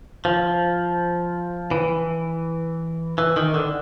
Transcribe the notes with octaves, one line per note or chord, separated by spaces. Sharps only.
F3
E3
E3
D#3
D3